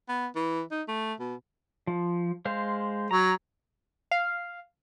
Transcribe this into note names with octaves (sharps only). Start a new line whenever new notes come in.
B3
E3
D#4
A3
B2
F3
G#3 C5 F5
F#3 A#5
F5